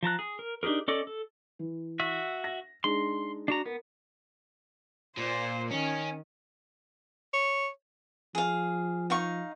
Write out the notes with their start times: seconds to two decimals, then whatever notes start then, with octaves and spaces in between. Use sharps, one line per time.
0.03 F3 A5 A#5 F#6
0.19 G#4
0.39 A#4
0.63 D4 D#4 G4 G#4 A#4
0.88 C#4 A4 D5 D#5 D6
1.07 A4
1.59 E3
2.00 F#4 E5
2.44 A#6
2.84 G#3 D4 D#4 C6
3.48 D4 F#4 A#5
3.66 B3 A#4
5.17 A#2 C5
5.71 D#3 C#4
7.33 C#5
8.35 F3 G#4 F5
9.10 D#4 F5 C#6